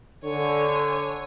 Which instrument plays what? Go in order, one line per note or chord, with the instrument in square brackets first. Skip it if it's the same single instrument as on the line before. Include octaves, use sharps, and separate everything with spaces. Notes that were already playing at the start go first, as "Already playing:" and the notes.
[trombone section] D3 [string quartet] C#5 G#5